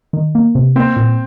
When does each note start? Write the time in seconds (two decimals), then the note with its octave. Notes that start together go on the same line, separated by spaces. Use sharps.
0.13 D#3
0.35 A#3
0.55 C3
0.76 A#3 C4
0.97 A#2